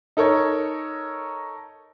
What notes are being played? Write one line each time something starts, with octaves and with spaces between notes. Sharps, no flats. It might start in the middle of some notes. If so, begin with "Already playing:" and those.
D#4 A4 A#4 C#5